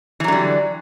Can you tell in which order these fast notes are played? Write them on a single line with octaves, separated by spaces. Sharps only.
E3 F#3 D3 G3